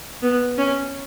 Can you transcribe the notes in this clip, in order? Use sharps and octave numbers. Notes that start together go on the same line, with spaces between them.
B3
C#4